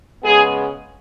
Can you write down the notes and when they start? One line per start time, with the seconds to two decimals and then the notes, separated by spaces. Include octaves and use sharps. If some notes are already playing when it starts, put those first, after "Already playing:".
0.23 C#3 G#3 B3 G#4